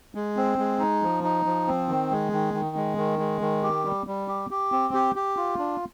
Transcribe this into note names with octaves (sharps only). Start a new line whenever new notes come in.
G#3
C4
G#3
D#4
F3
D#4
F3
C4
D#3
G#3
D#3
D#3
G#3
D#3
G#3
D#3
G4
G3
G3
G4
G4
C4
G4
G4
F4
D4